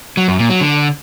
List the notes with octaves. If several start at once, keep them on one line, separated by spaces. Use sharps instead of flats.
F#3
F#2
A#2
F#3
D3